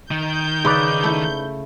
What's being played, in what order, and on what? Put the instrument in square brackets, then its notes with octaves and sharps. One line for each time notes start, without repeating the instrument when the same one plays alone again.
[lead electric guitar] D#3 [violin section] G6
[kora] C#3 [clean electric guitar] D#4 B4 D5
[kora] A3 E4